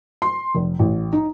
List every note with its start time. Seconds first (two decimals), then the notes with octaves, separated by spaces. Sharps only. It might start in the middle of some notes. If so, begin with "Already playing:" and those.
0.22 C6
0.55 F1
0.79 A1
1.13 D#4